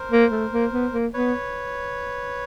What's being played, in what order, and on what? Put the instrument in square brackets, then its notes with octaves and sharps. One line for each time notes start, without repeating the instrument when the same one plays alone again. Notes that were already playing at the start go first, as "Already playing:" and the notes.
Already playing: [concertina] A#4 C5
[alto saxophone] A#3
A3
A#3
B3
A#3
[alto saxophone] B3 [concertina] B4 C#5